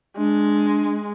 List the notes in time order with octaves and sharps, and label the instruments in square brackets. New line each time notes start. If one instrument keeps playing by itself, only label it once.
[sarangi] G#3 [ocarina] D4